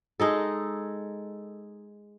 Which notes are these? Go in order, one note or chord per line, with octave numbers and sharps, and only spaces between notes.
G#3 D#4 A4